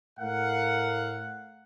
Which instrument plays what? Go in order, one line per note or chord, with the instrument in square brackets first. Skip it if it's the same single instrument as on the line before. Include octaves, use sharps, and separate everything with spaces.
[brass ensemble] A2 A#4 F5 F#5